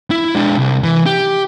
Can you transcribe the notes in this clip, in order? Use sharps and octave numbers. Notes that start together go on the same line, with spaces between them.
E4
G#3 D4
C2
E3
G4